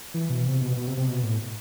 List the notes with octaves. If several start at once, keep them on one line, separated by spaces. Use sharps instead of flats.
E3
B2
C3
B2
B2
C3
C3
B2
A2